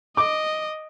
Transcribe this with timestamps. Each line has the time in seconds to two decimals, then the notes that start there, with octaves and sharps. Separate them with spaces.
0.17 D#5 D6